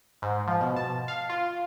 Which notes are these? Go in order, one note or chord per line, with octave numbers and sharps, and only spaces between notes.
G#2
F3
B2
A5
F5
F4